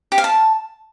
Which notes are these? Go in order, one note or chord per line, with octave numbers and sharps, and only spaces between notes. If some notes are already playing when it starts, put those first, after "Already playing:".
G4
F5
A5